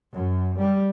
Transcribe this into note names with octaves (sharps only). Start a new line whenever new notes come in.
F#2
G3